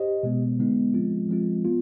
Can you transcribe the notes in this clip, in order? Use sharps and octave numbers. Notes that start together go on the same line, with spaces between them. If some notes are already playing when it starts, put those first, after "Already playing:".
Already playing: G4 C5 D#5
B2 G#3 B3
D3 G#3 B3 D#4
F3 G#3 C4 F4
F3 G#3 C4 F4
B3 F4